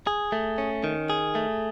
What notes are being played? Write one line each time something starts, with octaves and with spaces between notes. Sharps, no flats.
G#4
A3
C#4
D#3
G#4
A3